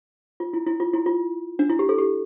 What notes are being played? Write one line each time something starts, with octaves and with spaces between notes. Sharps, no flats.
F4
E4
E4
F4
E4
F4
D4
E4
G4
A4
G4